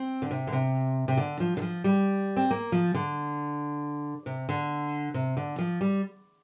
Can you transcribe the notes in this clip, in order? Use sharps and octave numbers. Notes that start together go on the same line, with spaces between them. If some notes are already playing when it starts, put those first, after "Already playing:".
Already playing: C4
D3
C3
D3
C3
C3
D3
F3
D3
F3
G3
C4
A#3
F3
D3
C3
D3
C3
D3
F3
G3